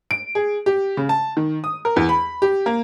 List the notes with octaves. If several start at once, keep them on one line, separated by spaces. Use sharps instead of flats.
D7
G#4
G4
C#3
A5
D#3
D#6
A#4
E2
B5
G4
A#3